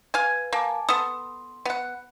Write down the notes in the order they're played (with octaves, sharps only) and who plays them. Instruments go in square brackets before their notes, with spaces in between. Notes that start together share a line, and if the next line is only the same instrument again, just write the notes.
[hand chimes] B4 [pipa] F5 G#5
[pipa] A#3 [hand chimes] G#5 A5 D6
[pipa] B3 A4 [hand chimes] C6 [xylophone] D#6
[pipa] B3 F#5